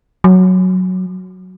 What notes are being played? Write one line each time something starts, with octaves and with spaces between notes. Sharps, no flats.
F#3